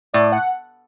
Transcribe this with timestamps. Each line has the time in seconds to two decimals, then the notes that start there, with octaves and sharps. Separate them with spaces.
0.13 A2 D5
0.32 F#5